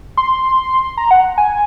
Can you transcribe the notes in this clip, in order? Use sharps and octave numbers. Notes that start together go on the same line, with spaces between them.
C6
A#5
F#5
G#5